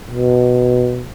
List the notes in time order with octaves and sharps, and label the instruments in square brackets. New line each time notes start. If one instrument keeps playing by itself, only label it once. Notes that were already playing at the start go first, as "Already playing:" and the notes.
[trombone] B2